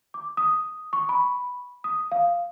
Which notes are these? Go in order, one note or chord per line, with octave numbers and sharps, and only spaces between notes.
D6
D#6
C#6
B5
D#6
F5